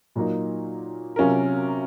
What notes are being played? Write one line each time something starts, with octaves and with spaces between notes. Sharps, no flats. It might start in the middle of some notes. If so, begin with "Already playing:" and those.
A#2 F#3 A#3 D#4
C3 F#3 C#4 F4 A#4